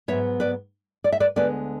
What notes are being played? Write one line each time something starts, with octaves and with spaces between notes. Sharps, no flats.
G#2 F#3 B3 C#5 E5
B4 D5
D5
E5
B4 D5
D2 D3 G#3 B3 B4 D5